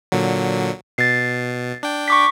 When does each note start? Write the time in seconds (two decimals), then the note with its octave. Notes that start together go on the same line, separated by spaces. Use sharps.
0.12 A#2 D3 F#3
0.98 B2 A6 C7
1.83 D4 G5
2.08 C#6 D6 B6